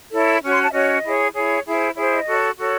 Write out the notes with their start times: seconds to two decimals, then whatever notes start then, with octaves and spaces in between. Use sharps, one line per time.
0.13 E4 A4 C#5
0.43 C#4 F#4 C#5
0.53 C6
0.63 A5
0.69 E5
0.73 C#4 F#4 C#5 D#5
1.04 E4 G#4 C#5
1.34 E4 G#4 C#5
1.65 E4 G#4 C5
1.96 E4 G#4 C5 C#5
2.11 D#5
2.26 F#4 A4 C#5
2.57 F#4 A4 C#5